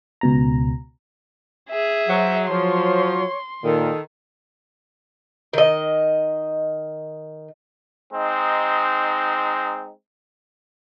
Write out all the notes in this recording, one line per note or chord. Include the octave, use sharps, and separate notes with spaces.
C#2 B2 A#5
G#4 E5
F#3 C5
F3 F#3 C#5 C6
A#2 D#3 A4
D#3 D#5
G#3 C4 D#4